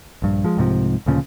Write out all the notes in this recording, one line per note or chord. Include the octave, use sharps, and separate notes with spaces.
A#1 G2
F3 G#3
C2 G#2 C3 F3
D2 A#2 C#3 F3